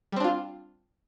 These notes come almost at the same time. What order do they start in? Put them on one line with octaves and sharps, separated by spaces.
G3 C4 D4 F4